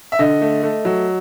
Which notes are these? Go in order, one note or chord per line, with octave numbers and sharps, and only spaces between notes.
E5
D3 D#5
A3
A3
F#3